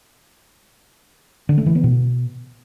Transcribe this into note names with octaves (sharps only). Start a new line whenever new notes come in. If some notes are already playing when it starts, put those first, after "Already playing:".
D3
A3
E3
B3
B2